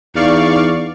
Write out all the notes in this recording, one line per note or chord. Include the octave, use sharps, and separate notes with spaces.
E2 D#4 D5 F5 C#6